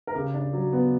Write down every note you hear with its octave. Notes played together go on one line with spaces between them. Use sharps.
A#4
C#3 G4
D4
F#3
B3